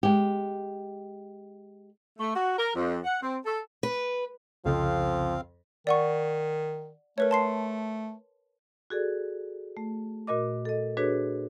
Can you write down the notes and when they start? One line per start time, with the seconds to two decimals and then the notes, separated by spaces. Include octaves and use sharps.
0.03 G#3 G4
2.19 A3
2.35 F#4
2.58 A#4
2.75 F2
3.04 F#5
3.22 C4
3.46 A4
3.83 B4
4.65 C2 F2 C#3 F3 C4 F5
5.87 D#3 D5 F#5 C#6
7.18 A3 A#4 B4 C#5
7.31 A5 C6 C7
8.90 F#4 G#4 A4 D5
9.77 A3
10.27 A#2 F#4 A#4 D#5 D6
10.65 A4 D#5
10.97 D4 F#4 G#4 A4 B4 C#5